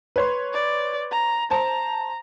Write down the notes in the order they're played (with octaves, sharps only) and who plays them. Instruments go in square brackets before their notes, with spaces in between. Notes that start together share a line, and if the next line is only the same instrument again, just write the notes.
[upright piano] B4 C#5 C6
[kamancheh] D5
A#5
[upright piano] C5 A5 [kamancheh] A#5